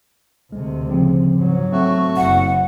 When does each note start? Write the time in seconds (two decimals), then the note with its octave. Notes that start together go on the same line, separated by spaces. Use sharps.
0.52 D2 C3 G#3
0.89 C#3 F3 C4
1.36 G#2 F#3
1.72 A3 C4 F#4
2.17 F#1 F#5